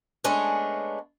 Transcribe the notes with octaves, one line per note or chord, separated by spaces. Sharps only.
G#3 A3 B3 C#4 D4